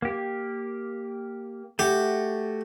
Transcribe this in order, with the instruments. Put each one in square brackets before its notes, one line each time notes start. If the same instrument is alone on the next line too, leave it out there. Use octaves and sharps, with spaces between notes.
[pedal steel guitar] A#3 G4
[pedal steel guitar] A3 F#4 [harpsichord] G4